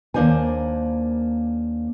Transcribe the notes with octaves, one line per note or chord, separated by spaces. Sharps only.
D#2 A#3 C4 D4 C5 G#5